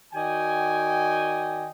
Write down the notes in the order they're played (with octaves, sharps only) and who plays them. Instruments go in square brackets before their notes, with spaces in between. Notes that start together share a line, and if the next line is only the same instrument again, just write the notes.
[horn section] D#3 F#4 D5 D#5 G5 G#5